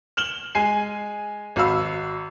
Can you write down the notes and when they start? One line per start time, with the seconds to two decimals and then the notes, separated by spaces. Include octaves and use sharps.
0.17 F6 E7 F#7 G7
0.55 G#3 G#5 C7
1.56 G#1 F#4 F5 B5 E6